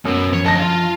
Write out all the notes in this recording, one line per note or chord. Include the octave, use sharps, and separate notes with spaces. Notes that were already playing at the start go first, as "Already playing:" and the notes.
F#2 B2
F3 C#5
D3 D#5 A5 A#6
F4 F5